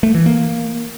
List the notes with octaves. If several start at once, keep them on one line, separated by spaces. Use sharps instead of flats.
A3
E3
A#3